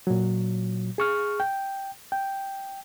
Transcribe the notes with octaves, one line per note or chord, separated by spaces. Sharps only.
A#2 F#3
G#4 C#6 F6
G5
G5